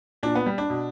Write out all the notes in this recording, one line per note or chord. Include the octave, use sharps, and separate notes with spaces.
A#2 D4
B3
G3
D4
B2